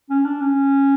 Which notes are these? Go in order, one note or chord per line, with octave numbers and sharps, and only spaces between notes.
C#4
D4
C#4